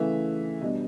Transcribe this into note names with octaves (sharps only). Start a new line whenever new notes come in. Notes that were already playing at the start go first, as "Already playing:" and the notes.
Already playing: C#3 E3 A3 E5
B2 G3 B3 D4 D#5